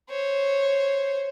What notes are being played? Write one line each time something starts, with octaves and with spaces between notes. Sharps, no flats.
C5 C#5